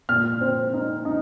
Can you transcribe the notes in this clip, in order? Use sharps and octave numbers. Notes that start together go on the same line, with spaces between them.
A#2 F6
C4
D#4
D#4